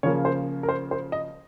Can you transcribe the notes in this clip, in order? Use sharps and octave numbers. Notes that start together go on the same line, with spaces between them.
C#3 F3 A#3 C#5
C5
A#4
C5
C5
D#5